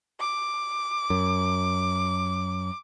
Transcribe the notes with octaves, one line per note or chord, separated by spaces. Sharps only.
D6
F#2